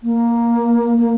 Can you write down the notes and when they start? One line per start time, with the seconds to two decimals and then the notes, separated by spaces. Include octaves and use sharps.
0.03 A#3
0.98 A#3